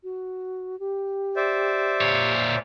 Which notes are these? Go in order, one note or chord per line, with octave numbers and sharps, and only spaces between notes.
F#4
G4
C5 D5 E5
A#2 C#5